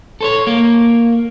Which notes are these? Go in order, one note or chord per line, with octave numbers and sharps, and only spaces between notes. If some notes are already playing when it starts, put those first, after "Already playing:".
A4 C5 C#5
A#3